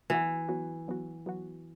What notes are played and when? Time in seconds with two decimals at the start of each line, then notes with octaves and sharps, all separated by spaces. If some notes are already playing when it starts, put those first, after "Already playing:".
0.10 E3 F#3 B3 F#4
0.49 F#3 B3 F#4
0.88 F#3 B3 F#4
1.26 F#3 B3 F#4